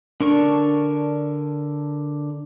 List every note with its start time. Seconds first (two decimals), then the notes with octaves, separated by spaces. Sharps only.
0.21 D3 D4 A#4 C#6